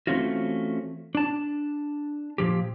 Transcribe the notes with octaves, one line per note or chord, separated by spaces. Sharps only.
E3 A3 C4 C#4 F4 F#4
D4 A5
A#2 F3 G4